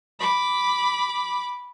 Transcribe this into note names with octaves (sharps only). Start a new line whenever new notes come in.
B5 D6